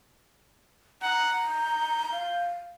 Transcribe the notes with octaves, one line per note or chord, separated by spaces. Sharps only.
F#5 A#5
G6
F5